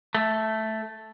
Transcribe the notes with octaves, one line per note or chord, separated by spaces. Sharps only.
A3